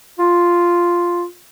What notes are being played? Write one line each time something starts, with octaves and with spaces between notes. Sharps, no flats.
F4